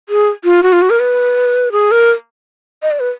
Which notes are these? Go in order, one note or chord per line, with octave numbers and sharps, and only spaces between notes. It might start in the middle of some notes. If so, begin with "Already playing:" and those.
G#4
F4
F#4
F4
F#4
A#4
B4
G#4
A#4
D#5
D5
B4